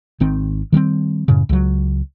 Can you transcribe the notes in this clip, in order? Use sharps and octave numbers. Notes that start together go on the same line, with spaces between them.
G#1 D#3 C4
D#3 G3 G#3 C4
F#2 A2 C#3
C#2 F#3